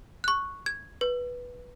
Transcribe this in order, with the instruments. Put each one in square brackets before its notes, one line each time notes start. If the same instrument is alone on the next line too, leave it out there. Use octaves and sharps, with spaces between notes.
[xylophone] C#6 F#6
G#6
B4